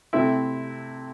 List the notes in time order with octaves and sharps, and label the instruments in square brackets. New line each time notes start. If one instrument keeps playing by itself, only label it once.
[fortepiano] C3 A3 C4 E4